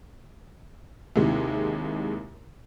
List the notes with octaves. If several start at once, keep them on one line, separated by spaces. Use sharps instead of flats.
D#2 C3 G#3 E4